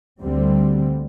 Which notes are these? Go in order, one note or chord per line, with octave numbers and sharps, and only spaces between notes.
D2 D3 G3 C4